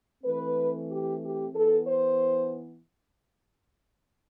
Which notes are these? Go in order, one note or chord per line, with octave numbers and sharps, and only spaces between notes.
E3 A3 C4 B4
G4
G4
E3 B3 A4
C5